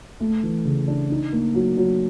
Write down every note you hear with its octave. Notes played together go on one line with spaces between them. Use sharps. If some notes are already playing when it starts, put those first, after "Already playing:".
A3
E3
C#3
D4
D#4
A#3
F#3
F#3